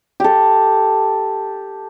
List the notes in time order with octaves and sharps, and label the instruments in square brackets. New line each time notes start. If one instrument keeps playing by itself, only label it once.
[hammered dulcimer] G4 A4